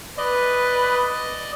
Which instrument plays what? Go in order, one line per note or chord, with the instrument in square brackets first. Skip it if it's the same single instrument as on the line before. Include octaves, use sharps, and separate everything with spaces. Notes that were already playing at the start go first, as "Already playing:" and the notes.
[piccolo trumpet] B4 [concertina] D5 D#5